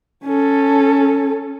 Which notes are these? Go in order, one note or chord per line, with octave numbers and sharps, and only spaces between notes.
C#4 A4